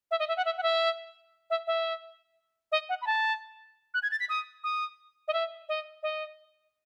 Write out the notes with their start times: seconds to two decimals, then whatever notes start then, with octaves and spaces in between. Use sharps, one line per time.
0.11 E5
0.20 D#5
0.28 E5
0.37 F#5
0.45 E5
0.57 F#5
0.63 E5
1.50 E5
1.67 E5
2.72 D#5
2.89 F#5
3.02 B5
3.07 A5
3.94 F#6
4.03 G#6
4.11 A6
4.20 B6
4.29 D#6
4.64 D#6
5.28 D#5
5.33 E5
5.69 D#5
6.03 D#5